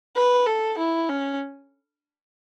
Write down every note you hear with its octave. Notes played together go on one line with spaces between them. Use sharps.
B4
A4
E4
C#4